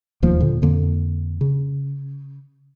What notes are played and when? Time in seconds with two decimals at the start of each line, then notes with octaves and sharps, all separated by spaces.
0.22 E1 D#2 F3 A#3
0.40 A#2 D3
0.62 F2 D3 A#3
1.41 C#3